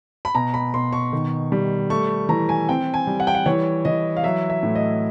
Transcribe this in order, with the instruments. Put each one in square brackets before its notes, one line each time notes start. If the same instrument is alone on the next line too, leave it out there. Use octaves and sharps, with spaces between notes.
[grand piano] B5
B2 A#5
B5
B2 C6
C#6
D#3
G3
A3 C#6
E3 A#5
G#5
C4 G5
G#5
G3
F#5
G5
F#5
E3 C#5
E3 D#5
F5
F#3 E5
E5
A2
D#5